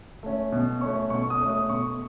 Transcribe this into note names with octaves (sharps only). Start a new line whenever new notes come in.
A3 C#4
B2
A3 C#4 C#6
B2 C#6
D#6
A3 C#4
D#6
B2 C#6